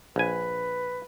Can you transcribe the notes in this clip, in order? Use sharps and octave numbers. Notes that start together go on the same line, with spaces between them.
A#1 B4 G#5